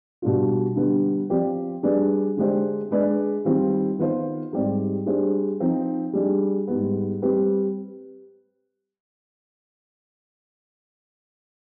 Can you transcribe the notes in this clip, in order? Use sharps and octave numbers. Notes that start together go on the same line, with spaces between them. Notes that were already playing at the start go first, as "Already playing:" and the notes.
B2 G3 D4 F4
D3 G3 B3
F3 C4 G4 D5
G3 D4 G#4 B4 D5
D3 G#3 D4 G4 C5
G#3 D4 G#4 B4 D5
D#3 G3 C4 F4
D#3 B3 F4 C5
G#2 G3 C4 G4 D5
G3 D4 G#4 C5
F3 C4 D#4
G3 D4 G#4 D5
G#2 G3 B3
G3 C4 G4 B4